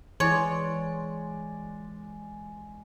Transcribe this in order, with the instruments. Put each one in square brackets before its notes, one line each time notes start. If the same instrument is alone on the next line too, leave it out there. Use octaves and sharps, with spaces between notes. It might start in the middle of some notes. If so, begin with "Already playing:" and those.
[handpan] E3 E4 [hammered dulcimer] G#3 D5 [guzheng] C#5